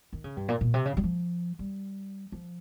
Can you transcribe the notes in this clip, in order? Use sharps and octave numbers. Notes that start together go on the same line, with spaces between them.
D#3
C#3
G2
A#2
A#2
C3
C#3
G3
F3
G3
F3